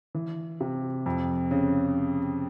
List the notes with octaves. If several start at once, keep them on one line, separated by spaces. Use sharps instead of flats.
E3
C3
F2
C#3